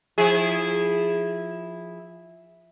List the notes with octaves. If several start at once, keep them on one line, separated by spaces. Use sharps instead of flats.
F3 E4 G#4